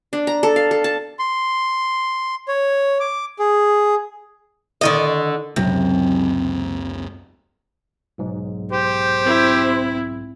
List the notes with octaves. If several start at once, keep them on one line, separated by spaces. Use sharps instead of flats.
D4
A#5
A4
F5
A4
A5
C6
C#5
D6
G#4
D3 D#3 D#5
C#2 F#2 C3 F#3
B1 G#2
G4 C5
C4 E4